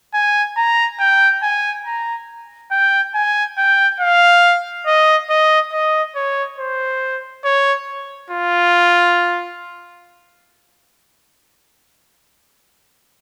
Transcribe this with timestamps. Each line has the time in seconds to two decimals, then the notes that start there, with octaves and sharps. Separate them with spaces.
0.14 G#5
0.57 A#5
1.00 G5
1.43 G#5
1.86 A#5
2.72 G5
3.15 G#5
3.58 G5
4.01 F5
4.87 D#5
5.30 D#5
5.73 D#5
6.16 C#5
6.59 C5
7.45 C#5
8.31 F4